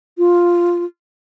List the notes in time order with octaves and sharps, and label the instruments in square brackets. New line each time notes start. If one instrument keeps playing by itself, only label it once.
[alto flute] F4